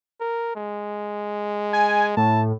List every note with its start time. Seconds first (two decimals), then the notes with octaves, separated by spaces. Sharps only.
0.21 A#4
0.56 G#3
1.73 G#5
2.17 A2 A5